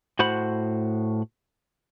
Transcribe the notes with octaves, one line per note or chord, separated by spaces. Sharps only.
A2 F#4 C5 F#5 B5